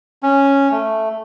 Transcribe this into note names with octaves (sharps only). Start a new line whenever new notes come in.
C#4
A3